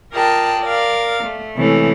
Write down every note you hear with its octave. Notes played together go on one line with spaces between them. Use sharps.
F4 G#4 A#4 D5 G5 A5
A#4 D5 F5
A3
C3 E3 G#3 A3 C#4